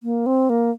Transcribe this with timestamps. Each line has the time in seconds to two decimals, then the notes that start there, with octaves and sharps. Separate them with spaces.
0.03 A#3
0.26 C4
0.50 A#3